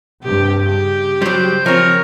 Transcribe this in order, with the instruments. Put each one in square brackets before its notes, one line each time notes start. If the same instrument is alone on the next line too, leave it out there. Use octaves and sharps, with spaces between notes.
[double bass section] G2 C3 [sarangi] G4
[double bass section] C#3 [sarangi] G4
[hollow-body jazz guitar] F#3 G3 [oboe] C5
[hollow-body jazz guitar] F3 C4 [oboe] A#4 [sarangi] C#5